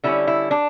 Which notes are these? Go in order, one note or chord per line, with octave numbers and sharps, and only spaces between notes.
D3 G3 C#4 E4
E4
D4